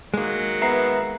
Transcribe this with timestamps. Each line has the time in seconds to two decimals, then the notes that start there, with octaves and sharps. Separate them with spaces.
0.14 D#3 F#3 G#3 A#3
0.62 B3 E5 A#5 C7